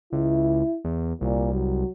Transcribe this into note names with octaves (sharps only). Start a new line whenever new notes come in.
C#2 E4
E2
C2 A#2
F#3